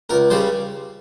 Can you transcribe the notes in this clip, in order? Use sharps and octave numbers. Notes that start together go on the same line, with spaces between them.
C#2 A#4
C#3 G3 C5